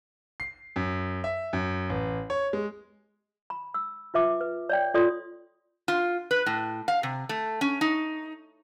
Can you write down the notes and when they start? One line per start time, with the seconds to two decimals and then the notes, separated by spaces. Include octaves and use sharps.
0.40 C7
0.76 F#2
1.24 E5
1.53 F#2
1.90 A1
2.30 C#5
2.53 G#3
3.50 B5
3.74 E6
4.14 F4 B4 E5 D6
4.41 B4
4.69 C#5 D5 G5
4.94 F4 A4 C#5 D5 C6 D#6
5.88 F4
6.31 B4
6.46 A2
6.88 F5
7.03 C3
7.29 A3
7.61 C#4
7.81 D#4